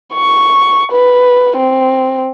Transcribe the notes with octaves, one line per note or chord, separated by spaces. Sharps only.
C#6
B4
C4